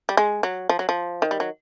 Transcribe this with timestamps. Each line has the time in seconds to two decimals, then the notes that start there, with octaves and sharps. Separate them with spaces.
0.09 G3
0.17 G#3
0.43 F#3
0.69 F3
0.79 F#3
0.89 F3
1.22 D#3
1.31 G3
1.40 F#3